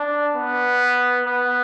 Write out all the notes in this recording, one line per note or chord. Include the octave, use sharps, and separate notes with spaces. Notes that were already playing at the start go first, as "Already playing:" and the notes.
Already playing: D4
B3
B3